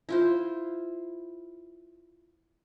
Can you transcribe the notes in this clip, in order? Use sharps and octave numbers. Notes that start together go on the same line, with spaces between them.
E4 F4 C5